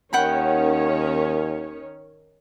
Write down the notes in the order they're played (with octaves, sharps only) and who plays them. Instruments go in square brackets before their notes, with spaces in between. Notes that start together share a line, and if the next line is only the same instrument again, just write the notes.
[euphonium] D#2 [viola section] D#3 C#4 C#5 [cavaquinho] F#5 G5 B5